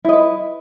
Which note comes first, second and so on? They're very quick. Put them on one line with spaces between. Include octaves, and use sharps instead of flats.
E4 D#5 B4